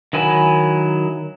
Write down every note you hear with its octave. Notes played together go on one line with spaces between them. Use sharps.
D#3 F#3 E4 G#5 B5